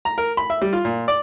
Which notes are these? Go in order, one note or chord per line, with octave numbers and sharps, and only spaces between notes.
A#5
A#4
B5
E5
G3
F4
A#2
D5